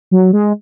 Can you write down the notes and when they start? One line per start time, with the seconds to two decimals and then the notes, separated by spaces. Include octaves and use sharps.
0.11 F#3
0.33 G#3